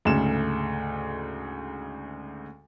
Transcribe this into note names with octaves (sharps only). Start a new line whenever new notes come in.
D2 G#2 C#3 A3 E7